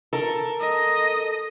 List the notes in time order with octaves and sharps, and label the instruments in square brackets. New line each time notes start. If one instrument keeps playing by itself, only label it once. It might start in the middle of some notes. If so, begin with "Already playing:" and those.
[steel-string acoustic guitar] A4 A#4
[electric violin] D#5